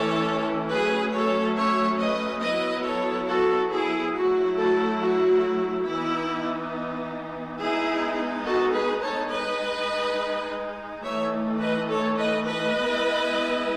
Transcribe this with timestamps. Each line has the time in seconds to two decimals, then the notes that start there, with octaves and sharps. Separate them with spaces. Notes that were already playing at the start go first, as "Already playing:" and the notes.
Already playing: E3 A3 C#4 E4 A4 C#5
0.70 F#3 A3 C#4 G#4 B4
1.13 A4 C#5
1.56 C#5 E5
1.99 B4 D#5
2.42 F#3 B3 E4 B4 D#5
2.85 A4 C#5
3.28 F#4 A4
3.72 E4 G#4
4.14 F#3 A3 E4 F#4
4.57 F#4 A4
5.00 F#4
5.87 E3 B3 D#4 E4
7.59 G#3 B3 D#4 E4 G#4
8.45 F#4 A4
8.73 G#4 B4
9.02 A4 C#5
9.31 G#3 D#4 B4 D#5
11.03 E3 A3 D#4 C#5 E5
11.60 B4 D#5
11.89 A4 C#5
12.17 B4 D#5
12.47 B4 D#5
12.75 G#3 B3 E4